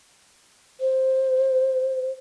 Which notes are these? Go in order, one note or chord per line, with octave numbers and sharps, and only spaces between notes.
C5